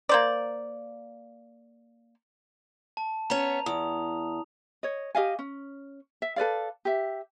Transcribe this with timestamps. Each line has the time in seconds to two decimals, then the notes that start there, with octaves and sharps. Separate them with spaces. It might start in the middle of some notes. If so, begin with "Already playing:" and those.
0.09 A#3 C5 D5
2.97 A5
3.30 B3 C#4 A#5 F7
3.66 E2 D#6
4.83 C#5 D#5
5.15 G4 D#5 F5 G#5
5.39 C#4
6.22 E5
6.36 A4 B4 D5 F5
6.85 G4 E5